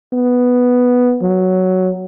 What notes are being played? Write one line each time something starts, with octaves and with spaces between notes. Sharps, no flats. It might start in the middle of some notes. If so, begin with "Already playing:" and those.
B3
F#3